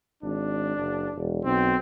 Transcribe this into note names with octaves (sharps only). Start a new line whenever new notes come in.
G#1 D4
F#1
E1
B1 C4